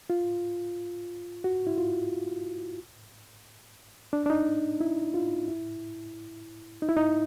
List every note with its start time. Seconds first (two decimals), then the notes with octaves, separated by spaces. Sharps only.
0.10 F4
1.44 F#4
1.67 E4
1.78 F4
4.13 D4
4.26 D4
4.30 D#4
4.80 E4
5.14 F4
5.48 E4
6.82 D#4
6.89 E4
6.97 D#4